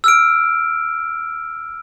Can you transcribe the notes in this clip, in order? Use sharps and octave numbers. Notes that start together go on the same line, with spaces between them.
E6 F6 D7